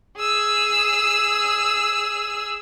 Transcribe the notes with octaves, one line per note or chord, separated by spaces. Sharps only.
G#4 E6